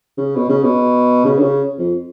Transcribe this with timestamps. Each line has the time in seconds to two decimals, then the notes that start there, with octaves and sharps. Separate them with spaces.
0.18 C#3
0.36 B2
0.49 C#3
0.63 B2
1.25 C#3
1.38 D3
1.43 C#3
1.78 F2